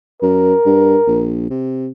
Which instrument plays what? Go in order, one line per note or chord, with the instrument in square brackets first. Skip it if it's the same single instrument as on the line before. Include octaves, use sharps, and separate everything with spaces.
[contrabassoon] F#2 [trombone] A#4
[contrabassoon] G2
A#1
C3